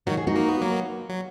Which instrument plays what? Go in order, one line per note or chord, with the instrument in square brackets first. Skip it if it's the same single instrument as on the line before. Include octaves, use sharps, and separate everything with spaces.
[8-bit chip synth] D#3 F#3 [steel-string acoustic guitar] F#4
[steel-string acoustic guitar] G#4
D#4 F#4
[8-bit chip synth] A#3
B3
F#3 A#3
F#3